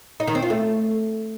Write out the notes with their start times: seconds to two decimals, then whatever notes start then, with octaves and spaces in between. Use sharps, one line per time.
0.20 D#4
0.27 D#3
0.35 C4
0.43 F4
0.50 A3